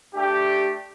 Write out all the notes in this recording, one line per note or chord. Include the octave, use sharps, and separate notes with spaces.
A3 D4 G4